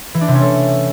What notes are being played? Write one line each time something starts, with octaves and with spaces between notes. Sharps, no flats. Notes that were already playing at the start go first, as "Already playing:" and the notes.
E3
D4
C3
C#4
A3